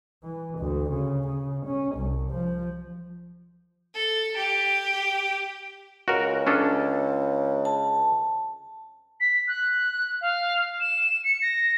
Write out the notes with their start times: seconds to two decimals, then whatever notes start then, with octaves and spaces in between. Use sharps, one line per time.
0.24 E3
0.58 D2
0.91 C#3
1.28 C#3
1.66 C#4
1.96 C2
2.29 F3
3.94 A4
4.36 G4
6.08 C#2 F#4 A#4
6.47 C#4 D4 A4
7.65 A5
9.20 B6
9.48 F#6
10.21 F5
10.80 E7
11.24 C#7
11.42 A#6